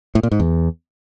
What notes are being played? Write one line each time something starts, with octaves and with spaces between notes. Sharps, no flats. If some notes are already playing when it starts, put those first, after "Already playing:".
A2
A#2
G#2
E2